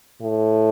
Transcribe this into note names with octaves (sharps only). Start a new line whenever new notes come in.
A2